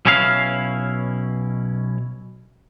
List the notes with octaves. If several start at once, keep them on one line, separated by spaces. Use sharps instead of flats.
B1 B2 C#4 E4 A4 F5